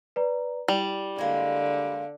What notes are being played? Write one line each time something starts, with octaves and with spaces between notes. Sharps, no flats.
B4 D5 A#5
G3 E4 F7
D3 G#3 A#3